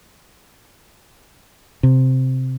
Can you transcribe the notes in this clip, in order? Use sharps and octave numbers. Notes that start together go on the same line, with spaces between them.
C3